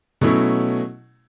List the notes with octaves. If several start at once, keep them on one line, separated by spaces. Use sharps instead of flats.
B2 F#3 A3 C#4 E4